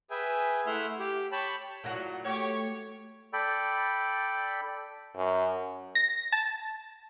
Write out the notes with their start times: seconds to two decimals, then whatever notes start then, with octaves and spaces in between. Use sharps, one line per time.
0.10 G#4 B4 E5 G5 G#5
0.66 A3 E4 E5 F#5 C6 F6
0.99 G4
1.32 C#5 G5 A5 B5
1.84 A#2 F#3 E4 F#4
2.25 A3 G4 C#5
3.33 A4 D5 G5 B5
5.16 F#2
5.95 A#6
6.32 A5